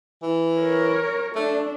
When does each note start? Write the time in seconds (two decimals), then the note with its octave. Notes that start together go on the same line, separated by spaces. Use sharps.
0.23 E3
0.59 A#4 C#5
1.36 A3 D4